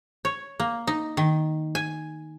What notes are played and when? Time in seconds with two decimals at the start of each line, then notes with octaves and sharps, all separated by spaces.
0.25 C#5
0.60 A#3
0.87 D#4
1.17 D#3
1.75 G#5